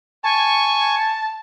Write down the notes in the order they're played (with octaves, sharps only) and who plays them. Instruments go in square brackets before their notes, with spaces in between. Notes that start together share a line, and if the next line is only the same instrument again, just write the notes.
[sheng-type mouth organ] G#5 C#6 [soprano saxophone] A5